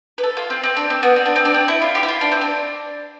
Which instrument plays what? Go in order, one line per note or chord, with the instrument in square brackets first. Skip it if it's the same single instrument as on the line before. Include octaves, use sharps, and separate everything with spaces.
[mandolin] B4
A4
F4
C4
C4
D4
C4
B3
C4
D4
C4
D4
C4
E4
F4
G4
E4
F4
D4
C4
D4